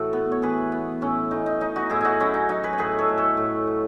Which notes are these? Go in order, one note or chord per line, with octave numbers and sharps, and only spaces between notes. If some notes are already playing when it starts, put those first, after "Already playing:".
Already playing: A2 E3 F#4 A4
B3
C#5
E3 G#4 B4
B3
A2 C#4 E4
A2 D#4
D#4
C#4 D#4
D#4 F#4
A2 E4 G#4
D#4 E4 F#4
F#3 C#4 E4
D#4
F#3 D#4
G#4 B4
C#5
A2 G#4 B4
A4 C#5
A2
A4 C#5
A2
F#3